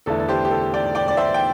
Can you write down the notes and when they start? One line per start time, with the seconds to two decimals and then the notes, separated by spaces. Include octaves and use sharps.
0.06 E2 D3 A3 E4 A4
0.20 A4
0.28 G4 C5
0.45 G4
0.51 A4
0.74 D5 G5
0.95 D5 G5
1.08 D5
1.17 C5 E5
1.34 G5